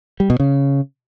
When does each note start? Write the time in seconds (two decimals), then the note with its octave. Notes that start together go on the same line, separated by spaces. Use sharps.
0.20 G3
0.30 B2
0.40 C#3